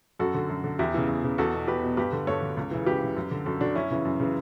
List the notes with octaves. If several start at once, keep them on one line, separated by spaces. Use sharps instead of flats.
F#2 F#4 A4
D3
F#2
D3
E2 E4 G4
C#3 E3
E2
C#3 E3
E2 F#4 A4
B2
E2 G4 B4
B2
G2 G4 B4
D3
G2 A4 C#5
D3
C#2
C#3 E3
C#2 G4 B4
C#3 E3
F#2
D3
F#2 F#4 A4
D3 D4 F#4
F#2 C#4 E4
C#3 E3
F#2
C#3 E3